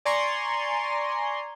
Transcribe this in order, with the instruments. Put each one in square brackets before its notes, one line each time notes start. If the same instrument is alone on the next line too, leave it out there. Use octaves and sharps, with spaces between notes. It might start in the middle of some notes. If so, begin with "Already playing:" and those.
[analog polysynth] D5 G#5 A#5 C6 C#6